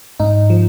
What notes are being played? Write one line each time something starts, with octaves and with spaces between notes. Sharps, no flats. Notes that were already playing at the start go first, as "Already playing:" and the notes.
G#2 D#4
F3